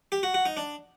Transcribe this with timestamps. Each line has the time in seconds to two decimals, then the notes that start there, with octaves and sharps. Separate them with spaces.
0.12 G4
0.23 F#4
0.34 F#4
0.46 D#4
0.57 D4